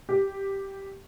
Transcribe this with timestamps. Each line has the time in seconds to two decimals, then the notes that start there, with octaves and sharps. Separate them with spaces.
0.09 G4